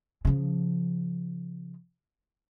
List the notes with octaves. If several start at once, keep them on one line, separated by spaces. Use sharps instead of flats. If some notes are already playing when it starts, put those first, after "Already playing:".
C#3 F3